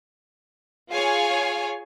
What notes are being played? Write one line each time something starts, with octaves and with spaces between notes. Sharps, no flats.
F4 G#4 C#5 F5 G#5